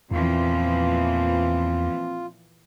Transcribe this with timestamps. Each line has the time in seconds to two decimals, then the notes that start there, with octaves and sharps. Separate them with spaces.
0.11 E2 A#2 E3 F3 C4 F4